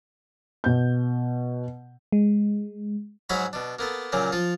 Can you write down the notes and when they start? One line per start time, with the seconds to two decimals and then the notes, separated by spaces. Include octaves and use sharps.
0.64 B2 G6
2.12 G#3
3.29 G#2 F#3 F#4 G#4 F5 B5
3.53 B2 D4
3.79 A#3 B3 A4
4.12 A#2 C#3 F#3 A#3
4.32 F3 F4